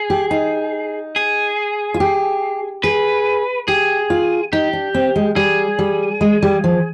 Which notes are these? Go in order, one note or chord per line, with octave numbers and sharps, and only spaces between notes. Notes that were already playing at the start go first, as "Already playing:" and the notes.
Already playing: G#4
G4
D#4
G#4
F4
G4
G#4 B4
G4 G#4
F4
D#4 G4
D4
C4
G#3
G3 G#4
G3
G#3
G3
F3